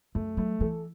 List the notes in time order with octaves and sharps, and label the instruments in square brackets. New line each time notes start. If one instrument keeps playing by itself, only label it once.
[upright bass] F#2 [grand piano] A3
[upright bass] F#3 [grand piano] A3
[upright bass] E3 [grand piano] A4